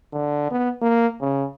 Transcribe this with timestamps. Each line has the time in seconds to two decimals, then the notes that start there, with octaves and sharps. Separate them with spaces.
0.13 D3
0.51 B3
0.82 A#3
1.21 C#3